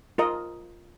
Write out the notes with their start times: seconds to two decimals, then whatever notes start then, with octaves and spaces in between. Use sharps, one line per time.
0.18 F4 A#4 D#5